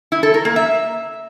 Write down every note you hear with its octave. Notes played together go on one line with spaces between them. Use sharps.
E4
A4
A#4
A#3
E5